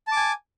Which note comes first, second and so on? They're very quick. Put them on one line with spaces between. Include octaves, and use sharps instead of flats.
A5 D6 G#5